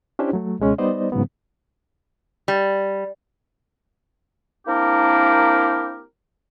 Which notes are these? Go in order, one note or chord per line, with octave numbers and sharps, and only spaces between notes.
C#4 D4 E4 G4 C5
F#3 A3
C#2 B2 G#3 C#4
G3 B3 D#4 C5 D5 D#5
G#2 C#3 F#3 B3
G3
A#3 C4 D4 E4 G4 A#4